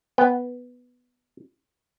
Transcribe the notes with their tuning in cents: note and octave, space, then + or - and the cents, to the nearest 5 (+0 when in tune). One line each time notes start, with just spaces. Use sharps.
B3 +0 G5 +10